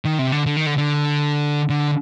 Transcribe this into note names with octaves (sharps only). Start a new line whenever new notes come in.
D#3
C3
D3
D3
D#3
D3
D3
D3